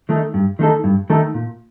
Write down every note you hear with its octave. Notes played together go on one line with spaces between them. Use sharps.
D#3 A3 D#4 A4
G2
D#3 A3 D#4 A4
G2
D#3 A3 D#4 A4
A#2